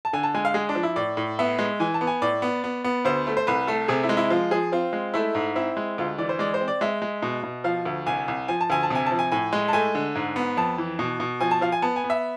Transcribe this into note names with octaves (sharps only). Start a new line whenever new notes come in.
A5
D3 G#5
A5
G#3 G#5
F5
G#3 G#4
D4
F3
E4
A2 D5
A2
B3 E5
G#3
E3 G#5
A5
B3
G#5
A2 D5
B3
B3
B3
D2 C5
A3
C5
C2 B4
A3 A4
C3 G#4
E4
G#3
E4
F3 F4
F3 G#4
C4 F4
G#3
A3 E4
G#2
C4 E4
G#3
D2 F4
E3 D5
C5
G#3 D5
C5
C4
D5
G#3 E5
G#3
B2
B2
F3 F5
D2
C2 G#5
C2
F3 G#5
A5
D2 G#5
A5
C3 G#5
F3 A5
G#5
A2 G#5
G#3
A5
A3 G#5
D3
G#2
B3
F2 A5
E3
B2
B2
F3 G#5
A5
F3 F5
G#5
B3 A5
G#5
B3
E5